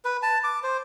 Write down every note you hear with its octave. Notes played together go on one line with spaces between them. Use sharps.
B4
A5
D6
C5